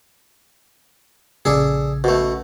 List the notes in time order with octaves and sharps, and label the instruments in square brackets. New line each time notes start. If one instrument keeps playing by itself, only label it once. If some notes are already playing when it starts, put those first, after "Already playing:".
[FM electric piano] A#1 C#3 [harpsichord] G#4 A4 D5
[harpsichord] B2 A3